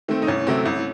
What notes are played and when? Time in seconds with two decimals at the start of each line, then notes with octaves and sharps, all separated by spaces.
0.08 D#3 A3 C4
0.22 D#4
0.27 C2 C#4
0.47 C3 F#3 A3 C4
0.65 C2